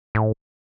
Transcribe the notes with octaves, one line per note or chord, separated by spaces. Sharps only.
A2